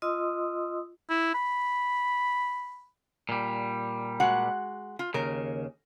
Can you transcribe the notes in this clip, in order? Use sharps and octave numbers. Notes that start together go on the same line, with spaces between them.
F4 D#5 C6 D#6 E6
E4
B5
A#2 G3
G#3 F#4 F#5
F4
D#2 C#3 A#4